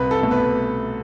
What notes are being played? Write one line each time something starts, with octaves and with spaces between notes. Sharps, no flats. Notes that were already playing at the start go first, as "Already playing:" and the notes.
Already playing: C2 B4
A4
B2 A3
B4